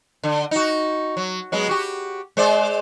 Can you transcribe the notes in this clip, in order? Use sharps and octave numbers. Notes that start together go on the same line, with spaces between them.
D3
D#4 F#4
F#3
F#3 G#3 B3
F#4 G4
G#3 C5 D5